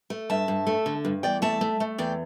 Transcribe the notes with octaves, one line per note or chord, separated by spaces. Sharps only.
A3
G2 E5 A5
G2
A3
D3
G2
E2 D5 G5
A3 E5 A5
A3
A3
E2 D5 G5